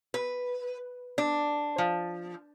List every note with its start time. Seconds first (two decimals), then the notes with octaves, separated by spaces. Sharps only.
0.14 B4
1.18 D4
1.78 F3